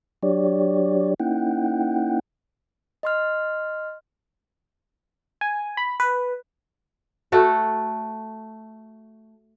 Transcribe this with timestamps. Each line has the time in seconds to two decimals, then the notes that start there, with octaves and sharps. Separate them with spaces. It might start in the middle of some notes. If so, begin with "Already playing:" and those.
0.23 F#3 D4 G4 C#5 D5
1.20 A#3 C#4 D#4 E4 F#5 G5
3.03 D#5 C6 F6
5.41 G#5
5.77 B5
6.00 B4
7.32 A3 F#4 A4